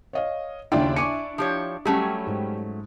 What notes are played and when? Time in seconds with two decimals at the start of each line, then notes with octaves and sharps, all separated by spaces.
0.13 C#5 D#5 F5
0.72 D#2 C#3 D4 E4 F4 G5
0.96 G#5 C#6 D6 C#7
1.38 F3 G4 C#5
1.85 F#3 G3 A3 C#4 G4
2.27 G#2